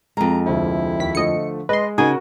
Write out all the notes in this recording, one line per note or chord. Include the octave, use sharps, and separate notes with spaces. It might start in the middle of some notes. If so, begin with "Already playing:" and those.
F2 G#3 A#5
F1 D2 C4 E4
D#2 B6
D3 F3 A3 D#5 C#7
G#3 B4 D#5 C6
C#3 D#4 F#4 A#4 G#5